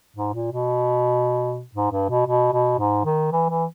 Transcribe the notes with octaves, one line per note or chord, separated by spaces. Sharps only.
G#2
A#2
B2
G#2
G2
B2
B2
B2
G#2
D#3
E3
E3